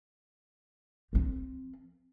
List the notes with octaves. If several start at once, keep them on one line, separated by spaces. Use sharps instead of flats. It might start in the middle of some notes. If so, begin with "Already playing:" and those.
F3 C4